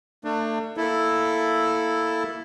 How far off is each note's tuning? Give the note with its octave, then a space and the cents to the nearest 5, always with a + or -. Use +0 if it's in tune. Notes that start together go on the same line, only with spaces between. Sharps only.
A3 +40 D4 +30
A#3 +0 E4 +0 A4 +0